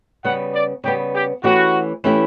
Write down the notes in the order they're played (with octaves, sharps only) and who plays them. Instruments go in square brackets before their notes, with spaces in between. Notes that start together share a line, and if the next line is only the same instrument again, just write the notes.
[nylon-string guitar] C#3 G3 B3 [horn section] F#5
[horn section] D5
[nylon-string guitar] C#3 G3 B3 [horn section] G4
[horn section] G4
[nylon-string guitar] E3 A3 C#4 E4 G4 [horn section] F#4
[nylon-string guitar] E3 A3 C#4 E4 G4